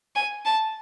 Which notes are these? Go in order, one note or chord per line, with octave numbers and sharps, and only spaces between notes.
G#5
A5